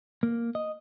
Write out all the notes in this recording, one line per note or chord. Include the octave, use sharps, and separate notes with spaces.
A#3
D#5